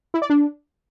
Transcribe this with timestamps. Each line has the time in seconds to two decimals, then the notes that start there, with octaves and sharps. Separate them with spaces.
0.14 E4
0.22 D5
0.30 D4